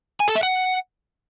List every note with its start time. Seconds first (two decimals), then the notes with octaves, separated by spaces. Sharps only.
0.20 G#5
0.28 A4
0.35 E5
0.43 F#5